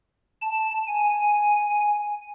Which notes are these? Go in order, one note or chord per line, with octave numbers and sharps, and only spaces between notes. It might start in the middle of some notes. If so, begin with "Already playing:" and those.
A5
G#5